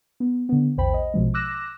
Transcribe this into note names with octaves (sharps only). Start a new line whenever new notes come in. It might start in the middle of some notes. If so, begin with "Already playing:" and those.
B3
D3 B3
A#1 E2 C5 G5 B5
D#5
A#1 B2 F3 G#3
D6 E6 F#6 A#6 E7